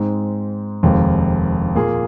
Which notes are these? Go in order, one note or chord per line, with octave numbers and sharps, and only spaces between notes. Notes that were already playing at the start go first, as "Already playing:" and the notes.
Already playing: G#2 G#3 C4
F1 D#2 D#3 G#3 C4
A#2 A#3 F4 G#4